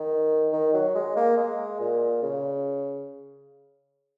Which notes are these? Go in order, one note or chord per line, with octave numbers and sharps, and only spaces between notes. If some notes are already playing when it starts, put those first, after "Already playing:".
Already playing: D#3
D#3
F#3
G#3
A#3
G#3
A#2
C#3